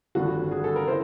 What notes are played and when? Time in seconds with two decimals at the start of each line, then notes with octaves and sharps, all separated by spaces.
0.15 G#1 G2 D3 F3 F#4
0.51 G#4
0.64 A4
0.76 A#4
0.87 C#3 E3 C5